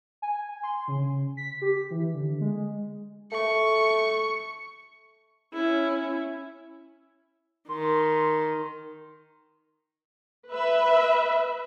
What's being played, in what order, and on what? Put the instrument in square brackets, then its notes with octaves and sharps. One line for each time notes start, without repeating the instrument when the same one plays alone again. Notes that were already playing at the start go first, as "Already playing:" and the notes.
[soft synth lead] G#5
C6
C#3
B6
G4
E3
D3
G#3
[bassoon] A3 [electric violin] C#6
[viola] C#4 E4
[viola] D#3 [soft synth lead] C6
[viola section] B4 E5